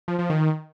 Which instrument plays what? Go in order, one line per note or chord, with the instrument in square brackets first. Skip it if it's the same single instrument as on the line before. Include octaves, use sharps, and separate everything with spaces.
[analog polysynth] F3
F3
D#3